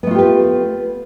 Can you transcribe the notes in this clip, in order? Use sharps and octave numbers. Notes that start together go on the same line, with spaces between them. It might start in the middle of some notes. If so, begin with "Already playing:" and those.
A3 B3 F4 G4 B4